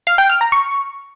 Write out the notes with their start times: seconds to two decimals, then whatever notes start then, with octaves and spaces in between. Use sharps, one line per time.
0.07 F5
0.18 G5
0.30 F6
0.41 A#5
0.52 C#6